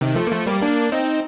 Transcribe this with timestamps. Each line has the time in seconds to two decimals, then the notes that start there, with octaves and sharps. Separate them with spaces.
0.01 C3 D#3
0.15 F3 A3
0.27 A#3
0.31 F3 A3
0.46 G3 A#3
0.61 A#3 D4
0.92 C4 D#4